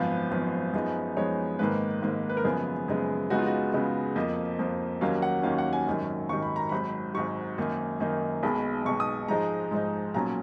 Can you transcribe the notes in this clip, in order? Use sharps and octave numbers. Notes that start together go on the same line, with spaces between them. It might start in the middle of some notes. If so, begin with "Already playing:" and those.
Already playing: G#1 F#2 F3 B3 F5
G#1 F#2 F3 B3
F#2 F3 G#3 B3 D#4
F#2 F3 G#3 B3 D#4 C#5
G#1 G#2 D#3 A#3 B4
G#1 G#2 D#3 A#3
B4
A#4
F#2 C#3 F3 G#3 B3 G#4
F#2 C#3 F3 G#3 B3
C#2 C#3 G#3 B3 D#4 F#4
F4
F#4
C#2 C#3 G#3 B3 D#4
F2 F3 A#3 D#5
F2 F3 A#3
D#2 D#3 F#3 A#3 C#4 F5
F#5
D#2 D#3 F#3 A#3 C#4 F5
F#5
G#5
G#1 F#2 D#3 F#3
G#1 F#2 D#3 F#3 C#6
B5
A#5
G#1 G#2 F#3 B5
G#1 G#2 F#3 C#6
F#2 D#3 A#3 D#4
F#2 D#3 A#3 D#4
B1 B2 G#3 B5
B1 B2 G#3 C#6
D#6
G#2 F3 G#3 D#4 A#5
G#2 F3 G#3 D#4
B1 A#2 F#3 C#4 A#5